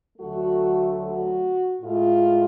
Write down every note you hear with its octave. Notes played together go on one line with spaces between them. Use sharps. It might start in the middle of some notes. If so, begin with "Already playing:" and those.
D2 D3 F#3 A3 F#4
F#4
A2 G#3 F4